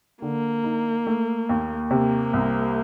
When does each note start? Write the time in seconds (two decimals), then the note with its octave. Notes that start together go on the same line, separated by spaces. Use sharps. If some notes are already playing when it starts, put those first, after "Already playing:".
0.22 D3 A#3
0.64 D#4
1.07 A3
1.49 D#2
1.91 C3 A#3
2.33 C2